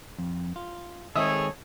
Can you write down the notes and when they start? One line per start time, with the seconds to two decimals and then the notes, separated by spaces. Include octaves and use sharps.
0.18 F2
0.56 F4
1.15 D#3 G#3 C4 G#4 A4 C#5 D#5 E5